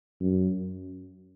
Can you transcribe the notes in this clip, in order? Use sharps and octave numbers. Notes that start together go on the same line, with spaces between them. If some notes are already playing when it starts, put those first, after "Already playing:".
F#2